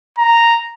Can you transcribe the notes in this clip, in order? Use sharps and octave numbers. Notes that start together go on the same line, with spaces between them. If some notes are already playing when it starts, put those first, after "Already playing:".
A#5